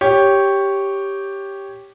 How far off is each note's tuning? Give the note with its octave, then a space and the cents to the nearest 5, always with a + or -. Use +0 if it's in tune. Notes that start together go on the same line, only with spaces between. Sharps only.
G4 +0 C#5 +0